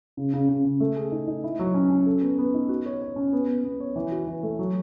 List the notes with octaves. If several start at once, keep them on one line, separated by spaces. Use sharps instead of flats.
C#3
C#3
C#3
C#3
A3
G#4
D#4
D#4
E4
F#3
C#4
C#4
A4
B3
B3
D#4
F#4
C#5
C#5
C#4
B3
B3
B3
C#5
E3
F#4
E3
A3
F#3